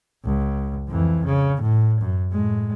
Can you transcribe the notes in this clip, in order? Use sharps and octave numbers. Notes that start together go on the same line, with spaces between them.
C#2
F2 E3
C#3
A2
F#2
A2 G#3